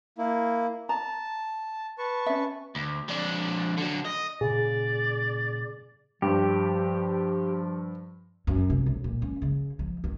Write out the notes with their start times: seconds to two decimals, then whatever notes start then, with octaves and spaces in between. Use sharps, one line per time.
0.18 A#3 E4
0.89 A5 A#5
1.98 B4 A5 C#6
2.26 C#4 E5
2.75 D2
3.09 F2 D4
3.78 D3 F#3
4.06 D#5
4.41 A#2 C#3 G#4 D5
6.22 G2 F3 G4
8.47 F#2
8.70 C3
8.86 B1
9.04 A#2
9.22 C#4
9.42 C#3
9.79 F3
10.04 D#3